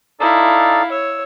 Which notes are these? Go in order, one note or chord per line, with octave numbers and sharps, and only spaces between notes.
D#4 E4 A4 D5 F5
C#5 E6